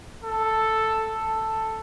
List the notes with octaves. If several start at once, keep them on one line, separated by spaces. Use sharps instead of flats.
A4
A4